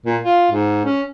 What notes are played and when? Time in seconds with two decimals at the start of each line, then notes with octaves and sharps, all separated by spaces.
0.06 A#2
0.23 F4
0.51 G#2
0.84 C#4